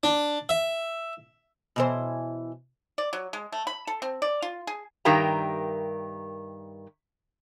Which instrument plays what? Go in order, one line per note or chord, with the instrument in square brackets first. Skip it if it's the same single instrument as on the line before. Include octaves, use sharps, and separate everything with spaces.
[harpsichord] D4
E5
[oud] B2 E3 C5
[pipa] D5
F#3
G#3
A3
B5
A4
C4
D5
F4
G#4
[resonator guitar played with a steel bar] G2 D#3 G4 A#4 E5 A#5